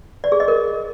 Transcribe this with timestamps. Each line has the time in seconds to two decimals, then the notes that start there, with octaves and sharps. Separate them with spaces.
0.24 D5
0.32 G#4
0.40 D#5
0.48 A#4